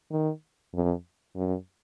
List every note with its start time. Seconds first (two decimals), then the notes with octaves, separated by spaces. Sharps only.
0.11 D#3
0.74 F2
1.36 F#2